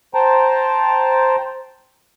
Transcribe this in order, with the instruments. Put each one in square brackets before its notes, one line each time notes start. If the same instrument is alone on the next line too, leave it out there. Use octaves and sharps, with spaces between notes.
[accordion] C5 G5 A5 A#5